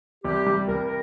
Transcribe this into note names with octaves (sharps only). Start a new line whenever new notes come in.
C2 G4
G3
C2 A#4
A#4